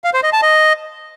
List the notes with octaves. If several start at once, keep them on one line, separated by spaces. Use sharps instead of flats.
F5
C5
D#5
A5
D#5